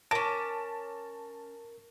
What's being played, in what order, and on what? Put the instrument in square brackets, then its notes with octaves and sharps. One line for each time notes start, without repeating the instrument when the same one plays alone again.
[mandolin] C#4 D6 [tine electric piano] A#4 A#6 [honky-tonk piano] A5